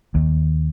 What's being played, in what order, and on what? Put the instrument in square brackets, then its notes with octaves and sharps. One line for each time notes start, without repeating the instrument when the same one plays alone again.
[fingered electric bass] D#2